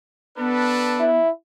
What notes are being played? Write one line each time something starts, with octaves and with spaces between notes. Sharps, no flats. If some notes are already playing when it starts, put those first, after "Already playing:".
B3 D4 A4 B4
E4